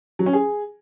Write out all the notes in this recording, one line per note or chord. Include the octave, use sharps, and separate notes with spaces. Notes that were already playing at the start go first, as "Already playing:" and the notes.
F#3
C#4
G#4